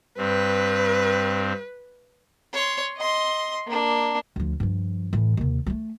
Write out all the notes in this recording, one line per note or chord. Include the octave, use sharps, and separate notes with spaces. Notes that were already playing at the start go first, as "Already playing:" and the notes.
G2 C4 B4
C#5 C6
D#5 C6
A#3 D4
D2 F3
G2 F3
A2 E3
D#2 C3
G3 A3